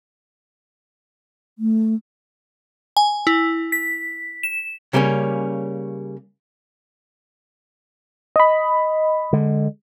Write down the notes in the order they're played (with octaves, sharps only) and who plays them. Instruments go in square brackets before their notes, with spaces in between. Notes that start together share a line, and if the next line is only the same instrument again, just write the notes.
[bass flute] A3
[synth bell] G#5
E4
B6
E7
[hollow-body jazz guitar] C#3 G3 A#3 C4 C#4
[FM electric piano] D#5 B5
[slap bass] D3 G#3